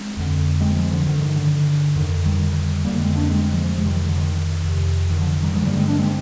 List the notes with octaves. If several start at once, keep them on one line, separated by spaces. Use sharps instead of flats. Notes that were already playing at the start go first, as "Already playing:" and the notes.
Already playing: G#3 C4
F2 D3
G#3 C4
F3 G#3
D3 F3
G2 D3 D#3
D#3
D3
F2 D3 D#3
D#3 G3
F2 D3 G3 A#3
G#3 C4
A#3 D4
G#3 C4
F3 G#3
F2 C3 F3 G#3
D#3 G3
D#3
D3
D#3
F2 C3
D#3
D3 F3
D#3
D#3 G3
G2 D3 F3 G#3
G3 A#3
G#3 C4
A#3 D4
G#3 C4